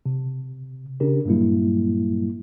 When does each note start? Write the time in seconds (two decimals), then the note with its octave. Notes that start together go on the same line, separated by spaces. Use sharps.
0.06 C3
1.00 C#3 C#4 D4 G4 A#4
1.25 G2 A#2 F#3 G3 A#3 E4